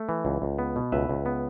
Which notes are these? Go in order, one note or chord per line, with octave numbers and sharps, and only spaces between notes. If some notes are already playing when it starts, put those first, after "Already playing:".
Already playing: A3
E3
C#2
C#2
B3
B2
C#2 B4 E5
C#2
B3